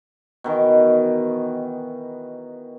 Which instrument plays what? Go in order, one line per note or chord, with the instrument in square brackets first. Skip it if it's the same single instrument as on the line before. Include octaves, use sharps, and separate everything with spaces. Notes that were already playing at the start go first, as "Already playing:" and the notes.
[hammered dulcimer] B2 D#3 E3